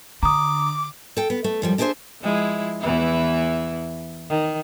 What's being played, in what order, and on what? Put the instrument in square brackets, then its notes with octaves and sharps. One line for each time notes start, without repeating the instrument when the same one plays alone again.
[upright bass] D3 [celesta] A#5 D#6 [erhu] D6
[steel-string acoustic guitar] A4 G5
B3
A3
F#2 F3 G3
D4 E4 G#4 B4 C5 E5
[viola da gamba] F3 G#3 E4
E2 E3 E4
D#3